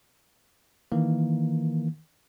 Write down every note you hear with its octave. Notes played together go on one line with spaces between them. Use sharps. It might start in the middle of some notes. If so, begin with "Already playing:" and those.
D#3 E3 A#3